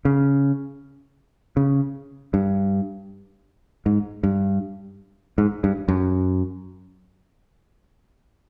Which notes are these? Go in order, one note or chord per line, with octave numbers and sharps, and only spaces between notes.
C#3
C#3
G2
G#2
G2
G#2
G2
F#2